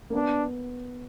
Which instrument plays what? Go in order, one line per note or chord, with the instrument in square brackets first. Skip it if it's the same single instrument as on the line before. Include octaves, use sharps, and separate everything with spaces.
[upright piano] A#3
[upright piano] B3 [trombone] D4